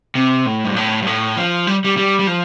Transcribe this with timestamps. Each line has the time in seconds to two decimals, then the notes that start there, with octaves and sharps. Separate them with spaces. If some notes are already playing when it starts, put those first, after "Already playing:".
0.15 C3
0.46 A2
0.65 G2
0.76 A2
1.02 G2
1.07 A2
1.36 F3
1.67 G3
1.85 G3
1.97 G3
2.19 G3
2.27 F3